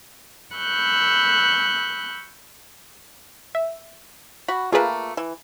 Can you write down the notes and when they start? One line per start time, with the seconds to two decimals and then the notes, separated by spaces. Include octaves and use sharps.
0.54 B5 C#6 E6 F#6 G6
3.55 E5
4.48 F#4 B5
4.72 A3 A#3 F4 G#4 B4
5.17 E3